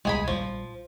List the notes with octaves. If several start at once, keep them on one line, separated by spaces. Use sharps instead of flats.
D#1 C2 G3 G#3 G#4 B5
A#1 E3 F3 G3